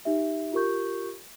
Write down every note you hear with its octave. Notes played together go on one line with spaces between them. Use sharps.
D#4 G4 E5
F4 G4 A#4 C#6 G6